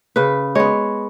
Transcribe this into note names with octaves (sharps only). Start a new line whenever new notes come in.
C#3 B4
G#3 B3 C#5